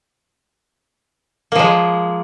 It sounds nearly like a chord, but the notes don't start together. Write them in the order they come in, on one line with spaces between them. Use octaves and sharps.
A#3 F3 G#3